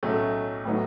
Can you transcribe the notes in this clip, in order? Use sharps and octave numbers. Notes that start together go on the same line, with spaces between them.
B1 A2 F#3 A3 C#4
A2 F#3 B3 D#4